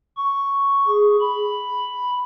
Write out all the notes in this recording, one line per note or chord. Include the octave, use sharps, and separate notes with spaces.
C#6
G#4
B5